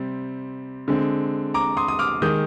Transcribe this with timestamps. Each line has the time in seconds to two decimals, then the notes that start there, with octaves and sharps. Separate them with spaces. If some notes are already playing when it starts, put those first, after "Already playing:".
Already playing: C3 G3 C4
0.88 D3 G#3 C4
1.54 A#5 D6
1.77 C6 D#6
1.88 D#6
1.99 D6 F6
2.22 D#3 G#3 D#6 G6